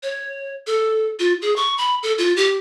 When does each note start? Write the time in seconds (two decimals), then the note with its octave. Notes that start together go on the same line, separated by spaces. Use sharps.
0.03 C#5
0.67 A4
1.19 F4
1.42 G#4
1.56 C#6
1.78 B5
2.03 A4
2.18 F4
2.36 G4